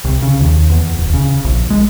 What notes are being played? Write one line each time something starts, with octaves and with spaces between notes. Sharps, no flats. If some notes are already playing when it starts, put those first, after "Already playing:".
C2
C#3
D#2
E2
D1
C#3
A#1
G#3